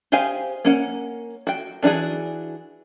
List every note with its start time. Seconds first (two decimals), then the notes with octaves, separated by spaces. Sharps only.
0.12 G4 G#4 C5 F5 G#5
0.65 A#3 C#4 F#5
1.47 F#4 G5
1.83 E3 D4 D#4 F#4 G#4